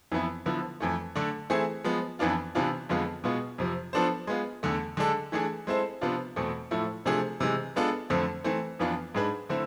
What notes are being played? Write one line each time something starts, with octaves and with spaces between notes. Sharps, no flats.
F2 E3 B3 E4
D3 F3 B3 E4
F2 E3 A3
D3 A3 D4
E3 A3 C4 E4 G#4
F3 G#3 B3
F2 E3 B3 D4 F4
C3 E3 B3 D4 F4
F2 D3 G#3 B3 F4
B2 G#3 B3 F4
F2 C3 F3
F3 B3 D4 A4 C5
G#3 B3 F4
E2 D3 A3
D3 G#3 D4 A4
E3 A3 D4 G#4
G#3 C4 E4 A4 C5
C3 F3 B3 D4 F4
E2 B2 A3 C4
A2 F3 A3 E4
C3 F3 A3 D4 G#4
C3 E3 G#3
G#3 B3 D4 F4 A4
F2 D3 A3 C4
E3 A3 C4
F2 E3 B3 D4 F4
G#2 G#3 D4 G#4 B4
D3 A3 C4 E4